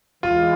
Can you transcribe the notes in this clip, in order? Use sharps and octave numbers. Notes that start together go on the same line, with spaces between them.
E3 G#3 F4